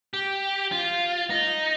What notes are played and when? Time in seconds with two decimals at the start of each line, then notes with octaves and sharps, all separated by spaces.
0.14 G4
0.72 F4
1.30 D#4